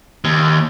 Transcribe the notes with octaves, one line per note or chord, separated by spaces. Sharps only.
D#2